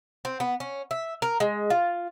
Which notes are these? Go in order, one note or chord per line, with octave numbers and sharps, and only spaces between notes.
C4
B3
C#4
E5
A#4
G#3
F4